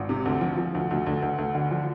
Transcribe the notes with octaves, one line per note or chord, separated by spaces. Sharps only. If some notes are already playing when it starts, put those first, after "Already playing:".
Already playing: G#1
C3
D2
F3
F3
D2
D2
D2
D2
D2
D3
F3